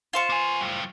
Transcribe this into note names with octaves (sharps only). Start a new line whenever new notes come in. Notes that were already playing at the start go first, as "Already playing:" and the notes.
F4 C5 C#6
A#3 G#5
A2 G3